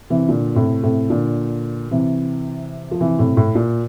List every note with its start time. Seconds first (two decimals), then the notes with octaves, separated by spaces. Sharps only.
0.10 C3 E3
0.28 A#2 D3
0.55 A2 C3
0.83 A2 C3
1.10 A#2 D3
1.91 C3 E3
2.91 F3
3.00 C3 E3
3.19 A2 C3
3.37 A2
3.55 A#2